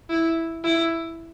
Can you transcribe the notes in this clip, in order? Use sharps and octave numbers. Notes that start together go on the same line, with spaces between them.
E4
E4